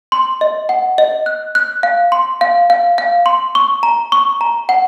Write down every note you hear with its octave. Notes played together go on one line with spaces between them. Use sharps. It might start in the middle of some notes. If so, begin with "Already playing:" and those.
C6
D#5
F#5
D#5
F#6
F#6
F5
C6
F5
F5
F5
C6
C#6
A#5
C#6
A#5
F#5